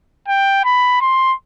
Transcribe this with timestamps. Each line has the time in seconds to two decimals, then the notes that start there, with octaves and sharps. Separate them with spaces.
0.28 G5
0.65 B5
1.01 C6